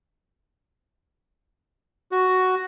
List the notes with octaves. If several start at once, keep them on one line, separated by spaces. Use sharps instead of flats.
F#4